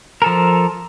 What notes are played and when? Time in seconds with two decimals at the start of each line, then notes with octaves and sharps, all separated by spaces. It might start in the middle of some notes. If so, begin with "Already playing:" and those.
0.22 F3 A4 A#4